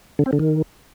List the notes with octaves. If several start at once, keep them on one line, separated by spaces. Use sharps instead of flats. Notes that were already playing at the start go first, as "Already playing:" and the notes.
D3
C4
D3
D#3